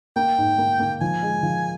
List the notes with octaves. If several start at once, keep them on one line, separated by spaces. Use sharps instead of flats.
A#3 G5
G#2
A#3
A#3
F3 G#5
G#3
F3